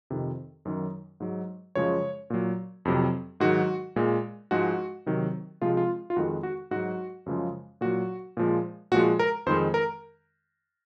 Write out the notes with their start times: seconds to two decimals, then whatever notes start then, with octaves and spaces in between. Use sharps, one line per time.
0.10 F2 C3 D#3
0.65 F#2 D#3 F#3
1.20 G#2 F#3
1.75 F#2 C#3 F3 G#3 C#5
2.30 A#2 F#3
2.85 F2 C3 F#3
3.40 G#2 D#3 F#3 F#4
3.96 A#2 G#3
4.51 G#2 F3 G#3 F#4
5.06 C3 D#3 F#3
5.61 C3 F3 G#3 F4
5.77 F4
6.10 F4
6.16 F2 D#3 G#3 F#4
6.43 F#4
6.71 G#2 F#3 F#4
7.26 F#2 C#3 F3 G#3
7.81 A#2 F#3 F#4
8.37 A#2 F3 G#3
8.92 A#2 F3 G#3 F#4
9.19 A#4
9.46 F2 D#3 G#3 C5
9.74 A#4